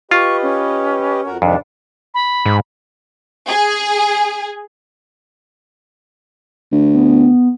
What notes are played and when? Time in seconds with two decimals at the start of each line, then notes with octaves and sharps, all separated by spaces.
0.11 F4 G4 B4 D#5 C#6
0.42 C#4
1.26 F2 F#4 A#4
1.42 F2 G#2 C3 D#3 D4
2.14 B5
2.46 G#2
3.48 G#4
6.72 D2
6.94 B3